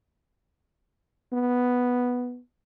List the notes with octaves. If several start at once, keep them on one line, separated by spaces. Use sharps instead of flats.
B3